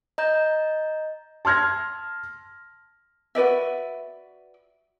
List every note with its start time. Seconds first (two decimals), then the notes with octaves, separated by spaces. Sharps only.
0.18 D#5 A#5 G6
1.45 A5 C6 F6 G#6 A#6
3.35 F#4 B4 D5 E5